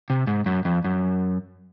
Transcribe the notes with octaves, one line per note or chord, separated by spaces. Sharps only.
C3
G#2
F#2
F2
F#2